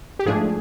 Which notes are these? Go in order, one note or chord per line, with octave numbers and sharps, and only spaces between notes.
G4
G#2 F3 A3 D4 G#4